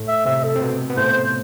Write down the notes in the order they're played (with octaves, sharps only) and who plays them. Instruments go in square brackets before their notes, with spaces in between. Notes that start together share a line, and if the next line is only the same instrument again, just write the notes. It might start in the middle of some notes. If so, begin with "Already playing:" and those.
Already playing: [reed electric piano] A2 A3
[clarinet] E5
[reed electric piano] C3 C4 [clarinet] E5
[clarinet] A4
[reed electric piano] C4
B2 B3
B3
[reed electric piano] A2 A3 [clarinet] C5